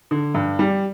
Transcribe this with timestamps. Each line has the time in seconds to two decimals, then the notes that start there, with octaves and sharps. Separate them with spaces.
0.11 D3
0.34 G2
0.59 G3